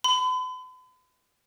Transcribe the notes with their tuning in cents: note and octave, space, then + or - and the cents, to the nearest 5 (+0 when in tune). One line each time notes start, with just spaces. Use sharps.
B5 +45